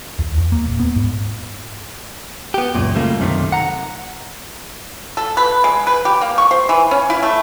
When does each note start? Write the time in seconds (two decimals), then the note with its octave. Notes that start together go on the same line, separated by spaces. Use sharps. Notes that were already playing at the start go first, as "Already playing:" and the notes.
0.19 D#2
0.38 E2
0.52 A#3
0.66 D#1
0.80 B3
0.96 G#2
2.54 B3 G4
2.75 C#2 F#2 A#2
2.95 C#3 G3 A3 A#3 F4
3.19 B1 F#2 C3 D#3 A3
3.52 F#5 A#5
5.17 A4
5.37 B4
5.64 G#3
5.87 B4
6.05 G4
6.21 A#3
6.38 C#6
6.51 C5
6.69 E3
6.91 C#4
7.10 E4
7.23 A3